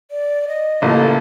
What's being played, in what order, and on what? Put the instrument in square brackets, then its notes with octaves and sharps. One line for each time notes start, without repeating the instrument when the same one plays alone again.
[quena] D5
D#5
[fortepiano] A1 [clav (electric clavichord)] C#3 E4 F4 [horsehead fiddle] A#3 A4